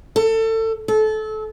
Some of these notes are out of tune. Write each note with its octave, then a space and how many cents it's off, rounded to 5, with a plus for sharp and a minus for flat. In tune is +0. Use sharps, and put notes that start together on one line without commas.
A4 +25
A4 -25